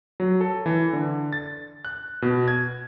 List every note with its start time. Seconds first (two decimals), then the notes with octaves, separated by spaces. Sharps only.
0.20 F#3
0.41 A4
0.66 E3
0.93 D3
1.33 A6
1.85 F#6
2.22 B2
2.48 G#6